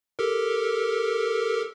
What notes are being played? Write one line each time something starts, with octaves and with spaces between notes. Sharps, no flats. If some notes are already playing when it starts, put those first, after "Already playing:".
G4 A4 A#4